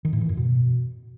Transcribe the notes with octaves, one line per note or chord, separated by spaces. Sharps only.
D#3
A2
E3
F#2
B2